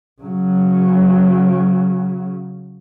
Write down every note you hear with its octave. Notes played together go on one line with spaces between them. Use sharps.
C#3 F#3